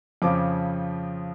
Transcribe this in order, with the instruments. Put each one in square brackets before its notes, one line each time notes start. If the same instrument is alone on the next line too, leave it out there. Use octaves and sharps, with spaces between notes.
[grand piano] F2 C#3 F3 D6